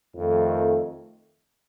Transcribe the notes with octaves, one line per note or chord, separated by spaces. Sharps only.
F2 D#3 A3